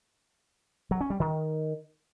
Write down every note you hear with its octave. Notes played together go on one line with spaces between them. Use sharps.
F#3
C#4
G3
D#3